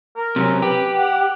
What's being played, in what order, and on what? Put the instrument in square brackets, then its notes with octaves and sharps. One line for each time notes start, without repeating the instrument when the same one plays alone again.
[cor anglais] A#4
[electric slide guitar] C3 F#3 C#4
[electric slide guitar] G4 [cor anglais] B4
[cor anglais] F#5